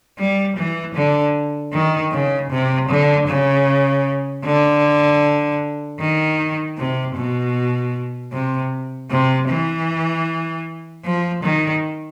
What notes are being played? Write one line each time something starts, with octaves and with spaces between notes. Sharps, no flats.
G3
E3
D3
D#3
C#3
C3
D3
C#3
D3
D#3
C3
B2
C3
C3
E3
F3
D#3